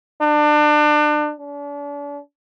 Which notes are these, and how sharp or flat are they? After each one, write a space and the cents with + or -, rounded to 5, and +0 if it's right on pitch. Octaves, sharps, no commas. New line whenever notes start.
D4 +30
D4 -40